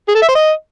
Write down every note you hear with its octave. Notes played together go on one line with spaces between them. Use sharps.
G#4
A4
E5
C5
D#5